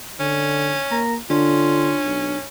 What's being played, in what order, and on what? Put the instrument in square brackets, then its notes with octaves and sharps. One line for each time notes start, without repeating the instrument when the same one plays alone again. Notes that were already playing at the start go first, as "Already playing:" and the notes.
[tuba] D3 [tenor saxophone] C#4
[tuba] A#3 [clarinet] A#5
[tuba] D3 [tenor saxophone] C#4 [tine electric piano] D4 [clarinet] F4
[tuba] B1